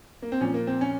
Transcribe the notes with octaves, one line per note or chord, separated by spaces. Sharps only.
A#3
C4
A#2 F3 C#4
A#3
C4
C#4